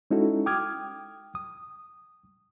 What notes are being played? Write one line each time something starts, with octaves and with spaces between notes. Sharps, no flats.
G#3 C#4 D#4 E4 F#4 A4
G5 D6 D#6 F6 G#6
D#6